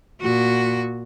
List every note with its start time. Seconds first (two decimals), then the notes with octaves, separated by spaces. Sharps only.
0.22 A#2 F#4